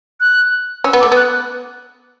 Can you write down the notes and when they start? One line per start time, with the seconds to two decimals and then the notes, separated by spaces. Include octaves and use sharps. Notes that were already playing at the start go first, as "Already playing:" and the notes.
0.20 F#6
0.84 C#4 E6
0.93 B3
1.00 A3 D6
1.12 B3 F#6